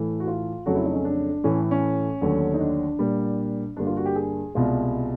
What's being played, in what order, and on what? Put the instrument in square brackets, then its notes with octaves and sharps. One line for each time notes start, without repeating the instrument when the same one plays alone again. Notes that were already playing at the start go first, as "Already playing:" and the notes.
Already playing: [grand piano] A2 E3 A3
F#4
F4
F2 C#3 F#3 A3 F#4
E4
D#4
C#4
D4
A2 E3 A3 C#4
C#4
D#2 D3 F#3 A3
D#4
D4
A#2 G3 A#3
G2 D3 G3 A#3 D4
F4
F#4
G4
G#4
C2 B2 G#3 F4